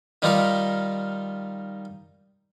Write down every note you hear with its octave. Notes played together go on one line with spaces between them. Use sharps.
D#3 G3 D#4 F4 G4 A#4